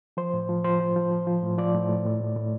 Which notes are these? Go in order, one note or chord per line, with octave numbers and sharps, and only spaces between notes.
F3 C5
A2
F3
F3 C5
F3
F3
F3
F3
A2
F3 D5
A2
A2
A2
A2
A2